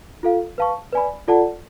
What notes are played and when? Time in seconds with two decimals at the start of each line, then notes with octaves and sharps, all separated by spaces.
0.23 F4 A4 F5
0.58 B4 F5 A5 C#6
0.92 B4 D5 G#5 B5
1.28 F4 A4 D5 F#5 A5